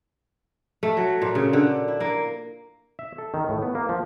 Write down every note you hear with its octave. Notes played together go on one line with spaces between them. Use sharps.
A3
F#3
A#2
C#3
D3
E4
A#3
E5
A4
D#3
A2
B3
A#3
F3